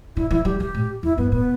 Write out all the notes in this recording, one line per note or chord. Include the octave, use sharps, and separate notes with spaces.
D3 E4
E3 E4
G3 G4
E3 G4
A2
E2 E4
G2 B3
A2 B3